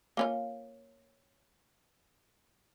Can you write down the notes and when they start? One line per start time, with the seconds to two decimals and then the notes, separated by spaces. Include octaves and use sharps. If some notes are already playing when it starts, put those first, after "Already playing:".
0.17 A#3 C#4 F4